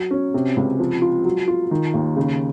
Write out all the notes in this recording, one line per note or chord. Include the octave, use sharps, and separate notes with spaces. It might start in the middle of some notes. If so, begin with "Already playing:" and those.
Already playing: F#3
C#4
C3
C#2
F3
F4
F#3
F4
D#3
D#2
C#3